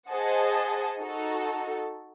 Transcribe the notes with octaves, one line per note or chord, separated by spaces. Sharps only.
G#4 C5 D#5 F#5 A5
D#4 F#4 A4